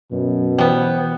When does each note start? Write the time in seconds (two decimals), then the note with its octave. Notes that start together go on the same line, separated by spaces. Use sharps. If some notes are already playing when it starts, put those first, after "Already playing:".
0.12 F#2 B2
0.58 E3 G3 B3 C5